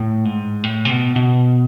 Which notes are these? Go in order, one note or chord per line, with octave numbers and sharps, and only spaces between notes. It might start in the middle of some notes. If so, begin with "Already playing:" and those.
Already playing: A2
G#2
A2
C3
B2
B2